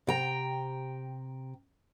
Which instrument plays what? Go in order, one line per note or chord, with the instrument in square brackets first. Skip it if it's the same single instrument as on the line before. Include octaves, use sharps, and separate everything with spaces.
[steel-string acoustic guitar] C3 G5 A#5